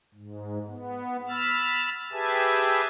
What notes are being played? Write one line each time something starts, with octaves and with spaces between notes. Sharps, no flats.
G#2
B3
B5 E6 F6 A6
G4 G#4 B4 E5 G#5 A5